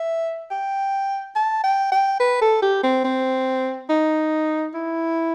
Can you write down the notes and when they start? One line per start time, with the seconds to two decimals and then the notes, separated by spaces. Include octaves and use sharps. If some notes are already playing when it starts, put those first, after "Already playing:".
Already playing: E5
0.51 G5
1.35 A5
1.63 G5
1.92 G5
2.20 B4
2.41 A4
2.62 G4
2.83 C4
3.04 C4
3.89 D#4
4.74 E4